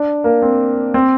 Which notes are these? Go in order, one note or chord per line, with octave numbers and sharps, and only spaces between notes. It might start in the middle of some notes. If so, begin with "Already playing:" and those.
Already playing: D4
A#3
C4
C4